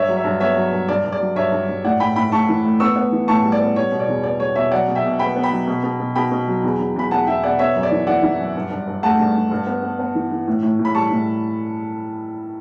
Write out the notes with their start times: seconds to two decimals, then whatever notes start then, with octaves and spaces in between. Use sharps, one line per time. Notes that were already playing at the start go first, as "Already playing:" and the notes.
Already playing: G2 C#5 E5
0.08 F#3
0.17 C#5 E5
0.24 G2
0.40 B3 C#5 E5
0.57 F#3
0.72 G2
0.89 G2 D5
1.04 G2
1.12 D5
1.20 F#3
1.36 G2 C#5 E5
1.52 G2
1.69 G2
1.84 A2 D5 F#5
2.00 A2 G5 B5
2.16 A2 G5 B5
2.32 A2 A5 C#6
2.49 E3
2.64 A3
2.80 B3 C#6 E6
2.96 B3
3.12 E3
3.28 A2 A5 C#6
3.44 G3
3.52 D5
3.60 B3
3.76 G3 C#5
3.92 B2
4.00 D5
4.08 E2
4.23 B3 D5
4.40 G3 C#5
4.55 B2 C#5 E5
4.72 F#3 D5 F#5
4.88 B2
4.95 E5 G5
5.04 B2
5.19 B3 G5 B5
5.36 B3
5.43 G5 B5
5.52 F#3
5.67 B2
5.83 B2
6.00 B2
6.15 B2 G5 B5
6.31 B2
6.48 F#3
6.64 E2
6.79 E2
6.96 E2 B5
7.11 E2 F#5 A5
7.27 E2 E5 G5
7.43 B2 D5 F#5
7.59 B3 C#5 E5
7.75 F#2
7.83 D5
7.92 E3
8.07 E3 D5 F#5
8.23 E3
8.39 F#2
8.55 G2
8.71 G2
8.87 G2
9.03 A3 F#5 A5
9.19 G2
9.35 G2
9.51 G2
9.67 B3
9.83 B3
9.99 B3
10.15 E3
10.31 E3
10.47 A2
10.63 A2
10.79 A2
10.85 B5
10.95 G3 A5 C#6
11.11 A2